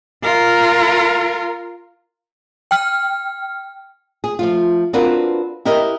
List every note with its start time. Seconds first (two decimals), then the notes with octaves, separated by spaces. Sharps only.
0.23 F4 A#4
2.71 G5 F6
4.24 G#4
4.39 F3 A3 F4
4.93 C4 D4 F4 F#4 A#4 B4
5.65 E4 G4 A#4 B4 D#5